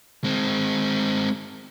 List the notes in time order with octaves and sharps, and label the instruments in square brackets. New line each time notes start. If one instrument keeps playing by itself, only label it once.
[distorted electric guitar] G#3 C4